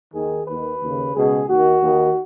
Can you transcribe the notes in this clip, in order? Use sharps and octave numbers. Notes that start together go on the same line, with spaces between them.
D#2 D#3 G#4
D#2 D#3 B4
D#2 C#3
C#2 B2 G#4
D#2 D#3 F#4
D#2 D#3